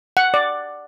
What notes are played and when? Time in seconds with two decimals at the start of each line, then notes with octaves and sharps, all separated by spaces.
0.17 F#5
0.34 D5